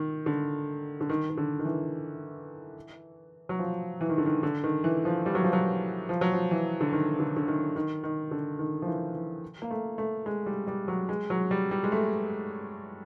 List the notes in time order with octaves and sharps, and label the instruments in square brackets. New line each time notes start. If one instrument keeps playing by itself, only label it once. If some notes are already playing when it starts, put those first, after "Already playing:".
Already playing: [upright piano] D#3
D3
D3
D#3
D#3
D3
D#3
E3
F#3
F3
E3
D#3
D3
D#3
D3
D#3
E3
F3
G3
F#3
F3
F#3
F3
F#3
F3
E3
D3
D#3
D3
D3
D#3
D#3
D#3
D3
D#3
F3
E3
E3
A#3
A3
A3
G#3
G3
G3
F#3
G#3
F#3
G3
G3
G#3
A3